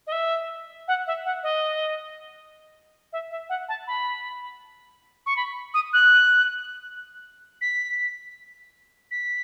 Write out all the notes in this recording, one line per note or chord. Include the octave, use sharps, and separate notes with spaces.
D#5
E5
F#5
E5
F#5
D#5
E5
E5
F#5
A5
B5
C#6
B5
D#6
F#6
B6
B6